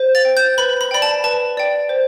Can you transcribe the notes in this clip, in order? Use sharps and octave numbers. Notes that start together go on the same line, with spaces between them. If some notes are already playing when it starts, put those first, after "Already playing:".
Already playing: C5
A6
G5
G6
B4 B5
B5
D5 G5 B5
A5
B4 A5
D5 G5
C5